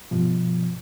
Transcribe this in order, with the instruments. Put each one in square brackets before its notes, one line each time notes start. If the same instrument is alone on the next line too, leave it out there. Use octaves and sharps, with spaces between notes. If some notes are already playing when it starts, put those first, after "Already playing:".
[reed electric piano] G2 B2 F3